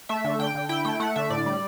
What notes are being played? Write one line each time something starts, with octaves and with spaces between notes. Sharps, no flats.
A3 E5
D3
D3 G5
D3
E4 G5
A3 G5
A3 F#5
D3 E5
A2 D5
G3